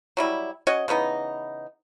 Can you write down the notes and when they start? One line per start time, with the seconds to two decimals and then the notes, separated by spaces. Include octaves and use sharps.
0.17 F#3 G3 E4
0.67 C#4 F#4 C#5 D#5
0.88 C#3 E3 B3 D#4